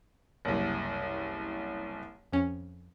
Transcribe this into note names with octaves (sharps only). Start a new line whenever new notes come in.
F#1 C2
F2 C#4